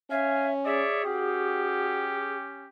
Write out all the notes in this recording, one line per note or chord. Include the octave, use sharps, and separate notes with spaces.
C#4 E5 F5 G#5
G#4 C#5 D5 E5
C#4 F#4 G4